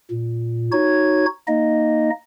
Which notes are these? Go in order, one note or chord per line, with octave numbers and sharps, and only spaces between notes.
A#2
D#4 F#4 C#5 G#6
A#3 D#4 D#5